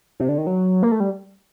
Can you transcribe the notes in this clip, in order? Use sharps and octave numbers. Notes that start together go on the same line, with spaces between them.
C3
D3
D#3
F#3
A#3
A3
G3